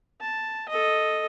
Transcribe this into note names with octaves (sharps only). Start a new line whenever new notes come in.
A5
A4 D#5